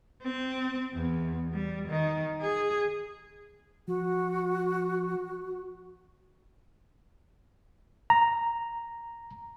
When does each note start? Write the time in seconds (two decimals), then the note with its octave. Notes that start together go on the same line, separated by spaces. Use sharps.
0.23 C4
0.93 E2
1.53 G3
1.88 D#3
2.42 G#4
3.88 F3 F#4
8.10 A#5